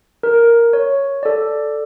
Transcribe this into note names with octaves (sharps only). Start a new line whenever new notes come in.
A#4
C#5
A4 D5